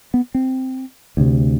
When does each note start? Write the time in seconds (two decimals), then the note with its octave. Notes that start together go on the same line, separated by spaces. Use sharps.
0.14 B3
0.35 C4
1.17 D2 C3